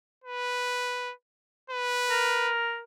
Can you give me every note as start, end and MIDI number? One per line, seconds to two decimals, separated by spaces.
0.24 1.13 71
1.70 2.53 71
2.10 2.81 70